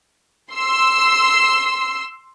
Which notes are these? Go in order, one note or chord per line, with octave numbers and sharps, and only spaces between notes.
C6 E6